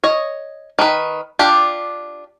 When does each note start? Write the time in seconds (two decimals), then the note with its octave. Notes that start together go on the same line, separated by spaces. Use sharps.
0.04 C#5 D#5
0.79 D#3 B4
1.39 D4 F4 G4